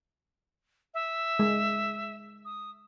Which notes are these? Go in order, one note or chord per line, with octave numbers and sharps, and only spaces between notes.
E5
G#3
D#6